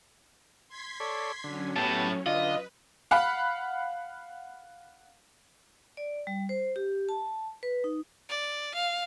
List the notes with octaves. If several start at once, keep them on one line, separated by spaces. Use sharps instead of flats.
C6 G#6 B6
A4 C#5 D5
D3 F#3 C#4
A2 B3 G4 A5
D3 F4 B4 D#5
F5 F#5 B5
D5
G3
C5
G4
A5
B4
D#4
D5
F5